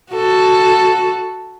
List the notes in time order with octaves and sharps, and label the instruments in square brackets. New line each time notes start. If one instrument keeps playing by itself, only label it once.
[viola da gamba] F#4 A4